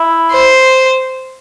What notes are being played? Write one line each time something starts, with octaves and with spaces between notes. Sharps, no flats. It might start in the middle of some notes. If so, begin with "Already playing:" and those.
Already playing: E4
C5